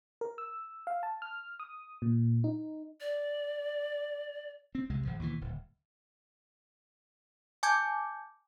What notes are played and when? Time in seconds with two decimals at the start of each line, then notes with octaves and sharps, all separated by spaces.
0.21 A#4
0.38 E6
0.87 F5
1.03 A5
1.22 F6
1.60 D#6
2.02 A#2
2.44 D#4
3.01 D5
4.75 C4
4.90 C2 C3 G#3
5.05 G#1 F3
5.19 D#2 B2 D3 E3
5.41 D1
7.63 G#5 A5 D6 G6 G#6